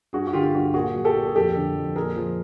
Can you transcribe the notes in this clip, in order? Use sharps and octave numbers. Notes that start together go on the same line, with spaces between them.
G2 F#4 G#4
F#4
D3 F4 G4
F4
G2 F#4
A#2 F#4 G#4
F#3
G4 A4
A#2
G#4
F2 G4 A4
D3
F2
A#2 G#4 A#4
F3